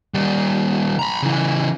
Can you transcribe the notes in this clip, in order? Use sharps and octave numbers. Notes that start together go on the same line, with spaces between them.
D#3 G3
A#5 B5
C#3 E3